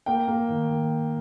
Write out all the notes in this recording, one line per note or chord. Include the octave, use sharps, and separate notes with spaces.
A#3 G5
A#3
D#3
D#3